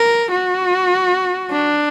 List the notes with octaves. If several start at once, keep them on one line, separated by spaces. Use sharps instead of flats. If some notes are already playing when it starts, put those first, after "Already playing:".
Already playing: A#4
F#4
D4